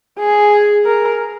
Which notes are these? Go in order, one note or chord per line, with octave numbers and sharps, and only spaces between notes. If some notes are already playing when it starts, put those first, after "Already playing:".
G#4
A#4